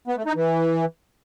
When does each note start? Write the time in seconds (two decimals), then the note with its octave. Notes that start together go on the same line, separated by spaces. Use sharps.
0.08 B3
0.17 A3
0.26 D#4
0.35 E3